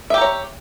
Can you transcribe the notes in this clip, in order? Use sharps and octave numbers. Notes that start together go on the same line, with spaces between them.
G4 C#5 E5 A#5